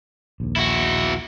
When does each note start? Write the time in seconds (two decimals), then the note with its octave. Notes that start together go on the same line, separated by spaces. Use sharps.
0.40 A#1 D#2
0.56 E4 F#4